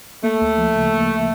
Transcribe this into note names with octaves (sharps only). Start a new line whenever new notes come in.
A3 A#3
D2
F3
C#3
A#3